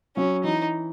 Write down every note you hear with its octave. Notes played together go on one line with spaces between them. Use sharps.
F#3 C#4
E3 D#4